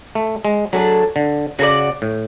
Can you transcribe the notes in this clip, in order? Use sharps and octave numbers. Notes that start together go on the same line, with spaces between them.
A3
G#3
F#3 A3 D4 G#4
D3
C#3 F#4 A4 D5
A2